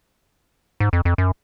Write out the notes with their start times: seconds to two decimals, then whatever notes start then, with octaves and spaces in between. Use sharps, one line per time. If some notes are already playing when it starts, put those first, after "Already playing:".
0.80 G#2
0.93 F2
1.05 F2
1.18 F#2